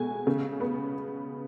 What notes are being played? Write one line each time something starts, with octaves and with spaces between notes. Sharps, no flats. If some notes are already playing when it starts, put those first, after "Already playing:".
Already playing: B2 G#3 A3 G#5
C#3
B3